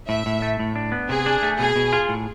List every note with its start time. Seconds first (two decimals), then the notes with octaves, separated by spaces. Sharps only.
0.09 A2 E5
0.26 A2
0.42 A3
0.60 A2
0.76 D4
0.92 B3
1.09 C3 G#4
1.26 D4
1.42 A3
1.59 B2 G#4
1.76 B2
1.93 F4
2.09 A2